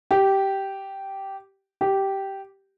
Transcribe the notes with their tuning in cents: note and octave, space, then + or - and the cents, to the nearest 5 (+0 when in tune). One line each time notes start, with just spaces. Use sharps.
G4 -10
G4 -10